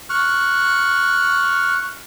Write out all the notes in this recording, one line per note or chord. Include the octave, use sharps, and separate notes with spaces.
C#6 F6 F#6